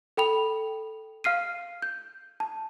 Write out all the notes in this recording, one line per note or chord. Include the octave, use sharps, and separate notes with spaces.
A4 G5 B5 F7
F5 F6 C7 D#7
G6
A5